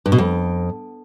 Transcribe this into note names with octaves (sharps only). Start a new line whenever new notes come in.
G2
B2
F2